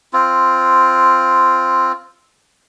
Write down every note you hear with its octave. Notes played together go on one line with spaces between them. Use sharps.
C4 F4